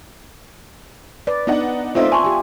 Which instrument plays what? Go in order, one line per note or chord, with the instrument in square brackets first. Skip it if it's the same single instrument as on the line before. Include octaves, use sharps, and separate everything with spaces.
[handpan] B4 D5
[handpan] B3 [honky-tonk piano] D4 D#4 F#5
[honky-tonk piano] A3 C4 D#4 [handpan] F4 D5 E5
[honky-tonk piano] G#5 [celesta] A5 C6 C#6
[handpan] F4 G4